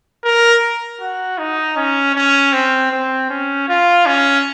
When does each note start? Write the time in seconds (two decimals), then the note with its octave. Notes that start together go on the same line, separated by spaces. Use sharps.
0.24 A#4
1.01 F#4
1.38 D#4
1.76 C#4
2.15 C#4
2.53 C4
2.91 C4
3.30 C#4
3.68 F4
4.06 C#4